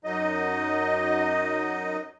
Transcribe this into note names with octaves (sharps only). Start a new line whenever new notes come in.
F#2 F#3 D#4 D#5